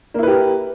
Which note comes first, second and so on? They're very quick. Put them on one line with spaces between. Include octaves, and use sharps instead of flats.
A#3 E4 B4 G4 A#4